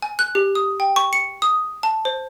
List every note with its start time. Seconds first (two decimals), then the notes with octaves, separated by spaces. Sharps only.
0.02 G#5
0.19 F#6
0.35 G4
0.55 D#6
0.80 G5
0.96 C#6
1.13 C#7
1.42 D#6
1.83 A5
2.05 C5